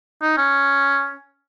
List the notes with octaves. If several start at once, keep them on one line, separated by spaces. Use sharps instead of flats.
D#4
C#4